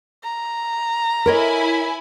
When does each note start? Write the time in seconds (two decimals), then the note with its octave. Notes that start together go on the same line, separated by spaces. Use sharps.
0.24 A#5
1.26 E4 A#4 C#5 D#5 G#5 B5